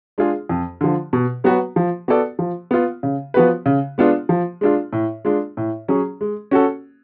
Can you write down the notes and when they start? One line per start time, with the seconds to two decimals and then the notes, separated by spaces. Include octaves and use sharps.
0.18 G#3 D4 F4 G#4
0.49 F2
0.81 D3 F3
1.13 B2
1.44 F#3 B3 F#4 B4
1.76 F3
2.08 B3 F#4 A4 D5
2.39 F3
2.71 B3 F4
3.03 C#3
3.34 F3 B3 F#4 B4
3.66 C#3
3.98 G#3 B3 D4 F4
4.29 F3
4.61 G#3 D4 F4
4.93 A2
5.25 G#3 D4 F4
5.57 A2
5.88 F#3 C#4 G#4
6.21 G#3
6.51 C#4 F#4 A4